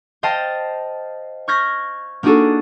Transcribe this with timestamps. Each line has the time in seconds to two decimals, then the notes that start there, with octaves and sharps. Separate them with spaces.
0.23 C5 D#5 F5 G5 A5
1.48 C#6 F6 G6 G#6 A#6 B6
2.23 A#3 D4 D#4 F#4 G#4 A4